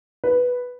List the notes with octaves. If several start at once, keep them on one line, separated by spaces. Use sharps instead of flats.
B4